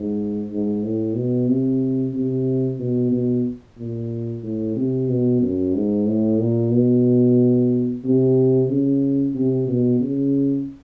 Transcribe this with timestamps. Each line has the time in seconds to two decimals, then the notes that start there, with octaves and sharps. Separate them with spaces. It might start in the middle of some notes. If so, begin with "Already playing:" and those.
Already playing: G#2
0.50 G#2
0.83 A2
1.15 B2
1.48 C3
2.14 C3
2.79 B2
3.12 B2
3.78 A#2
4.43 A2
4.76 C3
5.08 B2
5.41 F#2
5.74 G#2
6.07 A2
6.40 A#2
6.72 B2
8.04 C3
8.69 C#3
9.35 C3
9.68 B2
10.01 C#3